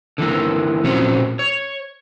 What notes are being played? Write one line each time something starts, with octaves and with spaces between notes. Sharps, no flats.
D3 E3 A#3
A#2 F3 F#3 C4 C#4 F#4
C#5